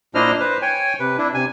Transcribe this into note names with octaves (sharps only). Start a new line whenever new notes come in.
A#2 D4 E4 C5 D#5 F6
B4 C5
C#5 G5 G#5
C3 B4
D4 E4
C3 G#5